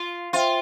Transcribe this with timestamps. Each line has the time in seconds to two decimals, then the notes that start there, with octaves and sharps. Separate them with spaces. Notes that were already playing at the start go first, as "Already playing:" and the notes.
Already playing: F4
0.33 F4 C5 E5 G5